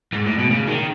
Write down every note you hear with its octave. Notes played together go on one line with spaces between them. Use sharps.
G#2
A2
B2
C#3
D#3